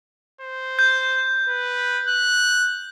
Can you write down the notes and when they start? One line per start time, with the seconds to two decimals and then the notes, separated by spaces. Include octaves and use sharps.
0.41 C5
0.79 G6
1.48 B4
2.08 F#6